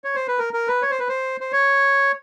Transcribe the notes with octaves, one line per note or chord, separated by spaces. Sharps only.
C#5
C5
B4
A#4
A#4
B4
C#5
C5
B4
C5
C5
C#5